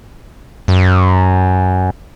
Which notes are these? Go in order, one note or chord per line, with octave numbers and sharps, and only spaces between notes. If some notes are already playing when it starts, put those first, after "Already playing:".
F#2